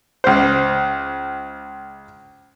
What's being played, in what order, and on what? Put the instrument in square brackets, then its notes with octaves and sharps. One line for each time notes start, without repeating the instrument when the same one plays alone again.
[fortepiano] C#2 C5